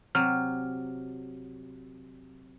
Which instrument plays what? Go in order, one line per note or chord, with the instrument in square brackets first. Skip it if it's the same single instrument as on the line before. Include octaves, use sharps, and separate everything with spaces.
[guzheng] C3 F#3 [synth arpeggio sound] F6